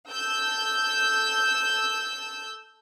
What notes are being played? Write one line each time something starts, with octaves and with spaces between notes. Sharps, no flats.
A4 E6 G6